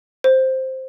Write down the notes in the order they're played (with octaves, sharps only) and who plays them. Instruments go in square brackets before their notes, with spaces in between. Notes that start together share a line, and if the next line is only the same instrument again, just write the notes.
[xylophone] C5